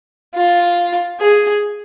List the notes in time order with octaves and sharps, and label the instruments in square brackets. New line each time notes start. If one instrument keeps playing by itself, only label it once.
[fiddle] F4
G#4